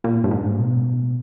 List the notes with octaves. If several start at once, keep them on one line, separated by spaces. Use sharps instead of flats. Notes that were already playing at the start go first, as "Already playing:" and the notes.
A#2
G2
G#2
A2
B2